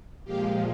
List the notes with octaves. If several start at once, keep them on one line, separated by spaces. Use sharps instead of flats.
A#2 F3 G#3 F4 G4